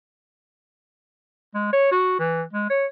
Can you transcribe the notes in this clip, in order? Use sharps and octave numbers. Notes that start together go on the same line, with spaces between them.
G#3
C#5
F#4
E3
G#3
C#5